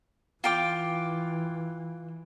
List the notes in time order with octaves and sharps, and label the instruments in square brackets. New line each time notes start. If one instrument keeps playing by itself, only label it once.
[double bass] E3 [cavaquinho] F4 G5 D6